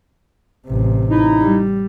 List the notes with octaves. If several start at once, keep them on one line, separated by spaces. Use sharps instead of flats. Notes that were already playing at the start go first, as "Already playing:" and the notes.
A1 C3
D#4 E4
G3